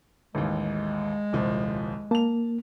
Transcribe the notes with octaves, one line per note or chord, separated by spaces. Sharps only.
A1 D#2 G#3
D#1 C2 F3
A#3 A5 F7